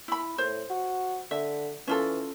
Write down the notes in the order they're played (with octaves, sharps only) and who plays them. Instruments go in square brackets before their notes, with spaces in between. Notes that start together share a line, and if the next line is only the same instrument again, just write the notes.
[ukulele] E4 B5
[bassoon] A2 [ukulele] C5
[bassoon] F#4
[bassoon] D3 [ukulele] E5
[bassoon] E3 [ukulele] C#4 F4 A4